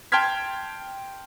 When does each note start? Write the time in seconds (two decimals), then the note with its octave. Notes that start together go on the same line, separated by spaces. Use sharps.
0.12 G5 A5 C6 F6 G#6 B6